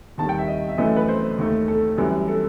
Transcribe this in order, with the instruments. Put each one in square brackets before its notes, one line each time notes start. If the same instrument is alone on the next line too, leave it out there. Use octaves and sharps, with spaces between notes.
[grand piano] D#2 D#3 G3 A5
G5
E5
D#5
E5
F#2 E3 A3 D#5
B4
C5
D#2 D#3 A3
A4
F#2 E3 G3
A4